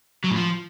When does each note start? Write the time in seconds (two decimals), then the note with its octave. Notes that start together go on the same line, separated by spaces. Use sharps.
0.24 F#3
0.30 A2
0.36 F3